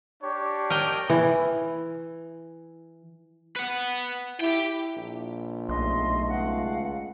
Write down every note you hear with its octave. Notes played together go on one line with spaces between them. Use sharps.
D4 G4 C#5
A#4 D#5 G5
E3 E4
B4 F#5
E4 G4 G5
A#1
B1 A3 D#5 C6
C#2 F5 F#5